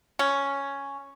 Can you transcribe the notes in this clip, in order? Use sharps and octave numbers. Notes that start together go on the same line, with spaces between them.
C#4